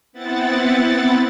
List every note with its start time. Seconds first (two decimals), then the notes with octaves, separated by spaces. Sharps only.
0.13 B3 C4 E4 F#5 A6